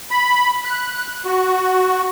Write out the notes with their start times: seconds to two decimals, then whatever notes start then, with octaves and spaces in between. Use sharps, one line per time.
0.11 B5
0.65 F#6
1.25 F#4